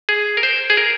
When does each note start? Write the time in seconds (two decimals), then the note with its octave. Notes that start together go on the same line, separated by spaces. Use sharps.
0.09 G#4
0.37 A#4
0.43 C5
0.70 G#4
0.77 A#4